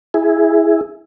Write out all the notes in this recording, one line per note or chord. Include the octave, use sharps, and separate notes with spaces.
E4 G#4